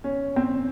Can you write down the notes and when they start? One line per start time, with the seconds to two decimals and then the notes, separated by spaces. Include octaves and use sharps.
0.04 C#4
0.36 C4